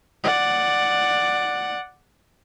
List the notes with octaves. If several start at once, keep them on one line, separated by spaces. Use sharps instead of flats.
D5 F#5